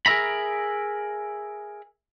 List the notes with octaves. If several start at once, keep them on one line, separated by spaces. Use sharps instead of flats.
G#4 A#4 B4 E5 A#5 B5